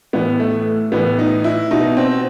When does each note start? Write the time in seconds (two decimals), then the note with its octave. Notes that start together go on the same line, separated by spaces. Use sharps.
0.13 A2 E3 B3
0.40 A3
0.92 A2 E3 B3
1.19 D#4
1.44 E4
1.71 B2 D#4
1.97 C4